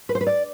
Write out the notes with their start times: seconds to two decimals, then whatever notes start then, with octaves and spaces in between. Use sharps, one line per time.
0.09 B4
0.15 C5
0.21 B4
0.27 D5